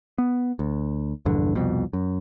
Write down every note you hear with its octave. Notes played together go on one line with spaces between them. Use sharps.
B3
D2
A#1 E2 G2 D3
C2 F2 B2
F#2